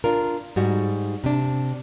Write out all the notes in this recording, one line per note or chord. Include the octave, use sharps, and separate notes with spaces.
D4 F4 A#4
G#2 G3 F#4
C3 D4